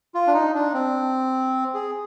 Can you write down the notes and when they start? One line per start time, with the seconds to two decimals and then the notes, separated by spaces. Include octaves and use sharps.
0.14 F4
0.27 D4
0.33 D#4
0.55 D4
0.74 C4
1.74 G#4